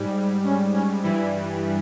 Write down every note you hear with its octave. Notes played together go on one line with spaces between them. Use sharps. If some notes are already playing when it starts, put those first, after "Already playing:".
Already playing: G#2 G3
C#4
C#4
G2 E3 G3 E4